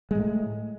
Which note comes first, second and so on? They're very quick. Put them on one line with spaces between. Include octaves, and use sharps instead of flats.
G#3 A2 A3